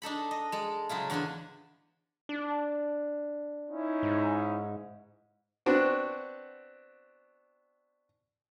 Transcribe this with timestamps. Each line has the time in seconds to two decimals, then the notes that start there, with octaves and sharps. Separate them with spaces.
0.02 D4 D#4 A4 B5
0.31 D#5
0.52 G#3 A4
0.89 C#3 F#3 E4 F4
1.10 E2 D3 D4 A4 G#5
2.29 D4
3.70 C#4 D#4 E4
4.03 G#2
5.66 B3 C4 D4 F#4